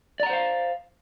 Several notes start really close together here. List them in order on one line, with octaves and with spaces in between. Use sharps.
D5 A#5 F#5 C5 F5